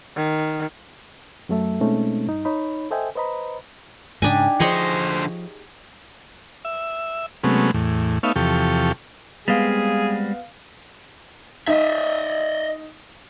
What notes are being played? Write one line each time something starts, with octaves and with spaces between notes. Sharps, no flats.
D#3
F#2 F#3 A3 A4 E5
B2 G#3 A3 C4 C#4 D#4
G2 D#4
D#4 C#5 B5
A4 C5 D#5 E5 G5 G#5
B4 C5 D#5 A#5 B5
G#2 C#3 D4 D#4 G4 G#5
D3 F3 G#4 C5 C#5 D#5
E5
C3 F#3 G#3 A3 B3 C#4
E2 A2
A3 B3 D#4 C#5 E5 F5
E2 C3 F3 G4 A4 C#6
G3 G#3 B3 C4 G#4 F5
D#4 D#5 E5